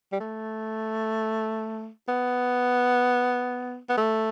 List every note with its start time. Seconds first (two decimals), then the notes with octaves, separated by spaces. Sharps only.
0.12 G3
0.20 A3
2.09 B3
3.89 B3
3.97 A3